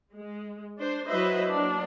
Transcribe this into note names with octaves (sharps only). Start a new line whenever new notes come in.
G#3
D4 C5
F#3 E4 B4 C5 D#5 E5
F#3 A#3 D4